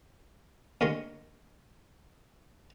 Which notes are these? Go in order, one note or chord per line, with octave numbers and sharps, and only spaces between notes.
D#2 D3 G#3 A#4 C#5